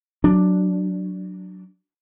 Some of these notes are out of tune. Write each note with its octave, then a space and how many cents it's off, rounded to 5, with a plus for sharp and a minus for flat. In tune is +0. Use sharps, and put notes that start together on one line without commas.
F#3 +0 D4 +0